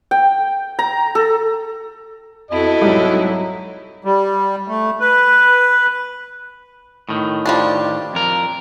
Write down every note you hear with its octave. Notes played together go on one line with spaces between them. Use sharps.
G5
A#5
A4
F2 E4 F#4 A4 D#5
C2 G#2 F#3 G3
G3
A3
B4
A2 D#3
F3 G3 D4
F2 A#4